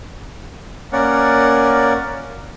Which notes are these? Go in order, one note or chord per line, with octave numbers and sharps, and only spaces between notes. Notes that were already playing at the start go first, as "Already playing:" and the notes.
A#3 C#4 A#4 C#5 D5 F#5